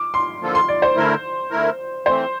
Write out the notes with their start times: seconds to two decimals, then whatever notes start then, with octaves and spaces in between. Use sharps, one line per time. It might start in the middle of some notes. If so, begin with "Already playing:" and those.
Already playing: D6
0.14 C6
0.41 D3 F3 A#3 F4 A4
0.55 C6
0.68 D5
0.82 C5
0.96 D3 A3 E4 A#4
1.51 D3 A3 E4 A#4
2.06 E3 A3 C4 C5